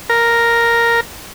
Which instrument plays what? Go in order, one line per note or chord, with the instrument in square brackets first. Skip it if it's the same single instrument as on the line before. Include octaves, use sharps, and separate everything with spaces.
[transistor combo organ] A#4